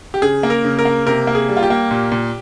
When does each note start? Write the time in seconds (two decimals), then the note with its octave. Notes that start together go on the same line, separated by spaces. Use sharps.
0.14 G4
0.22 C#3 G#4
0.43 A#3
0.50 A#4
0.64 C#3
0.79 A#4
0.85 A#3
1.06 C3 A#4
1.27 A#3
1.35 G#4
1.49 G3
1.57 F4
1.63 G4
1.70 A#3
1.91 A#2
2.12 A#2